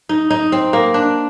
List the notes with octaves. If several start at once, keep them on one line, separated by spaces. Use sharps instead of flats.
D#4
D#4
C4
A#3
D4